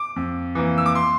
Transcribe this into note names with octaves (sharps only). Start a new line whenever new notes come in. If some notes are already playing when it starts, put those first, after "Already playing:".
Already playing: D6
F2
E3 A#3
E6
D6
C6